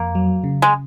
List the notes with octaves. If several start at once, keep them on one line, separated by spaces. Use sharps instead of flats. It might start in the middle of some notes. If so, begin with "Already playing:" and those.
Already playing: F2 A#3
F#3
C#3
G#3